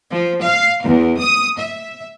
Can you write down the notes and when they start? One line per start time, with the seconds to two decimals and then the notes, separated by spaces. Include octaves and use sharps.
0.11 F3
0.43 F5
0.84 E2
1.19 D#6
1.59 E5